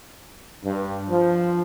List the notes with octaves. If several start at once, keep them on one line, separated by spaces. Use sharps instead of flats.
G2
F3